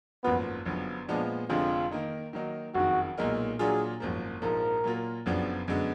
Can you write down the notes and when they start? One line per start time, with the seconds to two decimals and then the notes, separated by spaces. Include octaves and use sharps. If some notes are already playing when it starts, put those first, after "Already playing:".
0.24 G#1 F#2 F3 A#3 B3 F4
0.65 F#1 F#2 D3 F3 B3
1.08 A#2 F3 G#3 B3 D4
1.49 F1 F2 D3 F3 G#3 F4
1.91 D#3 A#3 D#4
2.33 D#3 F#3 A#3 D#4
2.75 F#1 F2 D#3 F#4
3.18 B1 A#2 G#3 D#4 A#4
3.59 A#2 F#3 D4 F4 G#4
4.00 G#1 F#2 F3 A#3
4.42 A#1 G#2 F3 A#4
4.84 A#2 F#3 A#3 F4
5.26 F#1 F#2 F3 B3 D4
5.68 F#2 D3 G#3 B3